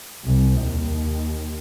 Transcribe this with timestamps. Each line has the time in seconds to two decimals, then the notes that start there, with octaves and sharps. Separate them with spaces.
0.24 C2
0.60 D#2